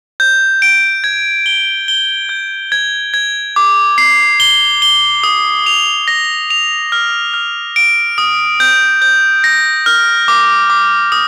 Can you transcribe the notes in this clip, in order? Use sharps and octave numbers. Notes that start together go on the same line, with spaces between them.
G6
D7
G#6
G7
G7
G6
G#6
G#6
D6
C7
G7
G7
D#6
F7
A#6
F7
F6
F6
D7
D#6
G6
G6
A#6
F6
D6
D6
D#6